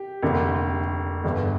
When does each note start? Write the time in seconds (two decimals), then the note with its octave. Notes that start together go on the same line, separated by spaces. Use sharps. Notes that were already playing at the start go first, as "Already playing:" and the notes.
Already playing: G4
0.22 F1 D#2 D3
1.24 G1 G2 D3